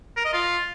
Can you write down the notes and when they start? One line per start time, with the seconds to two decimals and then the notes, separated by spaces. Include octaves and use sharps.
0.16 A#4
0.25 D#5
0.33 F4